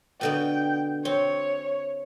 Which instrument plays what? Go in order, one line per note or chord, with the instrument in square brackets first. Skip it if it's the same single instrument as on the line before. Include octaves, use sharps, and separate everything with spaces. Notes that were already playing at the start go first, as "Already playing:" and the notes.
[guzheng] B2 D3 B3 [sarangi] G5
[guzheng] C4 [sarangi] C#5